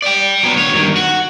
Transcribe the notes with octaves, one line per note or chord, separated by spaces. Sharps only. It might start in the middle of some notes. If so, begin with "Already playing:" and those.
D5 G5
F#3 B3
D2 C#5
G2 D#3
F#4